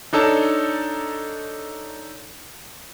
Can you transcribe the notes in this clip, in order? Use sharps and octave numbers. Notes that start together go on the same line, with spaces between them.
D4 D#4 A4 C#5 A5